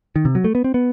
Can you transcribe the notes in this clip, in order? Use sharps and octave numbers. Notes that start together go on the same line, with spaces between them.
D#3
C3
F#3
A3
B3
C4
B3